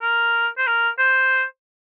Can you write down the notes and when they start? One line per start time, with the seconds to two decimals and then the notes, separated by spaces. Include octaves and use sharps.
0.02 A#4
0.58 C5
0.67 A#4
0.99 C5